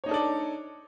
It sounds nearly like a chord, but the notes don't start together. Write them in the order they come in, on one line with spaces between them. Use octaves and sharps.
C#5 D#4 D4 A4 D5